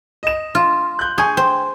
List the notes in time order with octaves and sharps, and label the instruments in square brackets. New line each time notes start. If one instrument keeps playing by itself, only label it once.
[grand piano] D#5 E7
[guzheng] F4
[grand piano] F#6 G6
[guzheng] G#4 [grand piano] G#5 C#6 G6
[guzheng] C5 [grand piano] G5